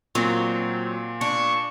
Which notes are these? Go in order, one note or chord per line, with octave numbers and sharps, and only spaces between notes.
A#2 F#3 C4
D4 C#6